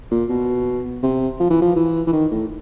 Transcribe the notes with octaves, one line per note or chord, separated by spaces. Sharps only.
A#2
B2
C3
F3
E3
F3
E3
E3
D#3
A2